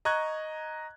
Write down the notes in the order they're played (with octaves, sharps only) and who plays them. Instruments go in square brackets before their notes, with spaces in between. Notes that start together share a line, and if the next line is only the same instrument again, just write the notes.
[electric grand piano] D#5 A#5 C#6 F#6 G#6